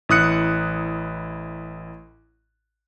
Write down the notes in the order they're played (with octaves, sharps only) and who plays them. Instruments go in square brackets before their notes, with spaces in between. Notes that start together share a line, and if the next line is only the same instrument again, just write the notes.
[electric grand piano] A1 E4 D#6 F#6 C#7